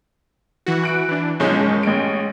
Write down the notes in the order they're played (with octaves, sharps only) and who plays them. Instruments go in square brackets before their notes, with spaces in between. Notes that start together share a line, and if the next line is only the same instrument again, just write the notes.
[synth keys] E3 F#4
[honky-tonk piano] F#6 D7
[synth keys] E3 D4
[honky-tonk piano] B1 F3 G6 [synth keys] G#3 C#4
[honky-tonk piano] F#1
A1 D7